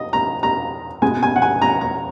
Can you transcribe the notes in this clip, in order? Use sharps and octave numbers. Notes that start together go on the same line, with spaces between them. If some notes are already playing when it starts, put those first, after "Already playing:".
Already playing: D#5
A#5
A#5
B2 G#3 B3 G#5
G#5
F#5
G#5
A#5
A#5